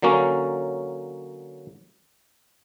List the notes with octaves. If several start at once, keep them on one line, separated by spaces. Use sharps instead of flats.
D3 F#3 A#3 C#4